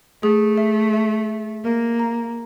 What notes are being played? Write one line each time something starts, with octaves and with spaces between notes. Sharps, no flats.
A3 G#4
E5
E5
E5
A#3 A#4
A#5